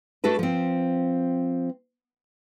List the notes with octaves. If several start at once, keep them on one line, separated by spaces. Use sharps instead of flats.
A3 D4 F#4 A4 B4
F3 C4